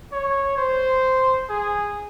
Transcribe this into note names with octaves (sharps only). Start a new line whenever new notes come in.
C#5
C5
G#4